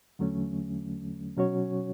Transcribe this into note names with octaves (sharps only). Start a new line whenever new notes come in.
E2 D3 F#3 A3 C#4
B2 F#3 C#4 F#4 C#5